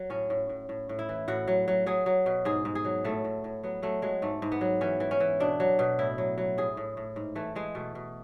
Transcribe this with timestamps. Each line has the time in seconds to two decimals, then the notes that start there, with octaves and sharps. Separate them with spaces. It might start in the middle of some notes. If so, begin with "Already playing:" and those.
Already playing: F#3
0.10 A2 C#4
0.30 A2
0.49 A2
0.69 A2
0.89 A2
0.99 E4
1.09 E3
1.28 A2 F#4
1.48 F#3
1.68 F#3
1.86 F#3 G#4
2.06 F#3
2.26 B2
2.45 G#2 G#4
2.65 G#2
2.75 G#4
2.85 F#3
3.04 A2 A3
3.24 A2
3.44 A2
3.63 F#3 B3
3.82 F#3 A3
4.02 F#3 G#3
4.22 G#2 A3
4.42 G#2
4.52 B3
4.61 F#3
4.81 E3 C#4
5.00 E3
5.11 C#4
5.20 E3
5.40 B2 D4
5.60 F#3
5.79 B2
5.99 A2 E4
6.18 F#3
6.38 F#3
6.58 A2 G#4
6.77 A2
6.97 A2
7.16 G#2
7.35 E3 A3
7.55 E3 G#3
7.75 B2 A3
7.95 B2